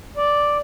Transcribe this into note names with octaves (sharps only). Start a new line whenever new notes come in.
D5